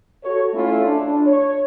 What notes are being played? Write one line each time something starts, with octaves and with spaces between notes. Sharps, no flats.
F#4 A4 C#5
A3 C#4 E4 F4 A4
D4
C#5